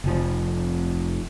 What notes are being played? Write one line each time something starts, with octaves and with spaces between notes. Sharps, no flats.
F1 F3